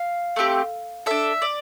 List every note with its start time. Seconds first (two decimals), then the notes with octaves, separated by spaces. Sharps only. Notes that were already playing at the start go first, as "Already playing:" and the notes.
Already playing: F5
0.36 A3 C4 G4
1.06 D4 A4 E5
1.42 D5